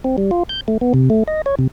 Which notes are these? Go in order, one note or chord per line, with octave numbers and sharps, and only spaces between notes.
C4
G3
F4
G6
A3
B3
C3
A3
D#5
C#5
C3